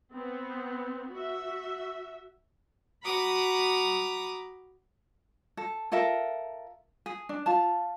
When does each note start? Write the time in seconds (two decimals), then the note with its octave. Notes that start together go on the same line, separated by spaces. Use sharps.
0.13 B3 C4
1.14 F#4 E5
3.03 F#4 A#5 B5 D6 D#6
5.57 A4
5.92 F4 A4 A#4 E5
7.06 G#4
7.29 D4
7.46 F4 A5